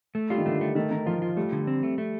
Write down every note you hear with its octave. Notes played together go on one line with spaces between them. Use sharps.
A3
G3 F4
D#3
D3 A3
A3
D#3 A3
D#3 A#4
F3 F4
F4
G3 A3
D3
C4
A3
A3